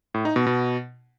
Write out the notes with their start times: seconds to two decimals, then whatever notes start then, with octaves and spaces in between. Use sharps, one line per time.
0.14 A2
0.25 D#4
0.36 B2
0.47 B2